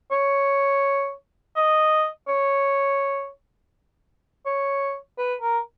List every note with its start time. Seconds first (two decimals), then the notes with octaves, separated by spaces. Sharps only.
0.11 C#5
1.56 D#5
2.28 C#5
4.46 C#5
5.18 B4
5.41 A#4